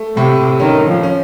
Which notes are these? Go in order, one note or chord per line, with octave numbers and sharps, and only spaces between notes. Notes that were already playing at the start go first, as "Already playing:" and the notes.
Already playing: A3
A2 C3
D#3 C#4
F3
C#4